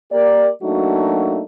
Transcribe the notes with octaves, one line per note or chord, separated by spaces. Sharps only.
A#3 G4 A#4 D5
F#3 A3 A#3 D4 D#4 F#4